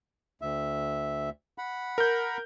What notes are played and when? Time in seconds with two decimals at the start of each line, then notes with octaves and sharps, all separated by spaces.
0.42 D2 E5
1.58 F#5 B5
1.98 A#4 G6